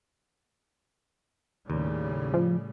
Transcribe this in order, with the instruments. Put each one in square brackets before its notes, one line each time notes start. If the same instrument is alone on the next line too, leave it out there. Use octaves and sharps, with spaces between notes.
[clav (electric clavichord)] D#2 [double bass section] A2 C#3 G3
[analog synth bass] F3